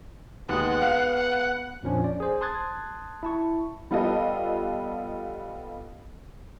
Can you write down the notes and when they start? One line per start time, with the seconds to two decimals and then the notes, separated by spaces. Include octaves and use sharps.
0.49 D#2 G#3 B3 F#5
0.82 F5
1.15 F#5
1.83 F2 A#2 F3 C#4 D4
2.04 D5
2.20 G#4 C5
2.41 A5 C6 D#6 F#6 G#6 A6
3.23 E4 A5 C#6
3.91 G3 B3 F4 A4 D#5